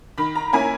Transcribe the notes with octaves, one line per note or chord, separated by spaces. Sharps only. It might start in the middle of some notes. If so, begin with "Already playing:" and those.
D#3 B5
A#5
A#3 C#4 E4 G#5